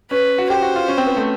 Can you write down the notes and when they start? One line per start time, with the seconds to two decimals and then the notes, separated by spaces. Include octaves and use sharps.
0.11 C#4 B4
0.38 F#4
0.50 G4 C5
0.62 F#4
0.76 F4
0.88 C#4
0.98 C4
1.07 B3
1.16 A3